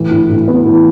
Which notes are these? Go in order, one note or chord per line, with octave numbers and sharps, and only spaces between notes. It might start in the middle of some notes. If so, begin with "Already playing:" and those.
Already playing: A2 E3
A2
A2
B3
E3